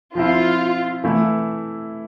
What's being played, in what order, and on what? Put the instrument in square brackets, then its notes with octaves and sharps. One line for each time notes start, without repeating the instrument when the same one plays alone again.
[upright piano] F3 C4 E4 [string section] F4
[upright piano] E3 A3 E4